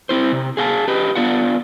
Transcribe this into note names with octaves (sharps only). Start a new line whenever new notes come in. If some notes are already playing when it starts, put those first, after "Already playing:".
C4 E4 C5
C3
G#4 F5 G5 A5
G4 B4 D#5
B3 D4 F4 F#5